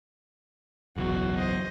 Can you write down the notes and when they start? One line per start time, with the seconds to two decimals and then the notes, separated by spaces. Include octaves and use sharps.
0.96 F#1 B1 E2 F#4
1.36 C5 D#5